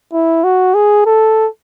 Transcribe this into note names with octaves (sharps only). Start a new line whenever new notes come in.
E4
F#4
G#4
A4